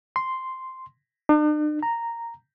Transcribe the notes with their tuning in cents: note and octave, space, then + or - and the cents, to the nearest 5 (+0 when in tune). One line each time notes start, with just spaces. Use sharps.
C6 -5
D4 +45
A#5 -5